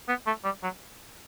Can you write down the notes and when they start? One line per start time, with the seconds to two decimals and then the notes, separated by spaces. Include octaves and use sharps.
0.08 B3
0.27 A3
0.44 G3
0.63 F#3